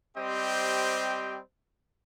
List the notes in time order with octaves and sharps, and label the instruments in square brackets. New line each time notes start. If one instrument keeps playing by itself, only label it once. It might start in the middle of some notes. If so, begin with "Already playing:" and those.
[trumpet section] G3 C4 G4 C5 D#5 G5